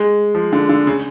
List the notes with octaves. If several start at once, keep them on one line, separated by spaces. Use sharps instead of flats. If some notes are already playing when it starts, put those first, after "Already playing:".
Already playing: G#3
F3
D3
D3
C#3